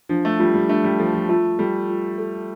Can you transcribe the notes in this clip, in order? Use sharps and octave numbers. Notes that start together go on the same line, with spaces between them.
F3 D4
A3
G3 F4
G3
A3 D4
G3
F3 A4
F3
A3 F4
G3 A4
F4
A4